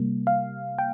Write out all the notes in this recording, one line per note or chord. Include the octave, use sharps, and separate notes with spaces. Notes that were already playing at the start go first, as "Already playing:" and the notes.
Already playing: C3 G3 A#3
F5
G5